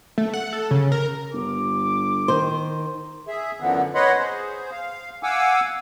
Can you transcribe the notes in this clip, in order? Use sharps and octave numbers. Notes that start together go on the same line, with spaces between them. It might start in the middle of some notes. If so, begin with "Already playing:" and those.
A3
F#5
A4
C#3
A#4
G1 D6
D#3 C5
G#4 E5
F#2 D3 E3 F3 B3
B4 C#5 D#5 F#5 B5 C6
G#4 C5
F5
F5 F#5 G#5 D6 E6